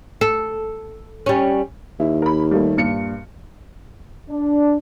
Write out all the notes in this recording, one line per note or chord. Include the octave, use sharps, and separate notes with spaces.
A4
G3 C#4
D#2 E4
A#4 B5
G3 A3 A#3
G2 A#2 C#7
D4